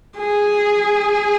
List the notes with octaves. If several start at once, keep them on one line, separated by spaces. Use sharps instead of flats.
G#4